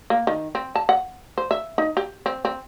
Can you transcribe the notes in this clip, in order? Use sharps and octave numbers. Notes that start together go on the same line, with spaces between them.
A#3
D#3
C4
A5
F#5
C5
E5
D#4
G4
C4
C4